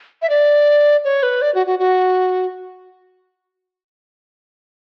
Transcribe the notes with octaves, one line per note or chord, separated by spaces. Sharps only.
E5
D5
C#5
B4
D5
F#4
F#4
F#4